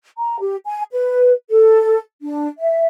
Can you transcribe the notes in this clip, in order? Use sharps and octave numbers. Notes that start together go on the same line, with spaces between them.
A#5
G4
G#5
B4
A4
D4
E5